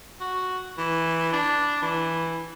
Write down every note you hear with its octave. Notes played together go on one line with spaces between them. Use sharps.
F#4
E3
D4
E3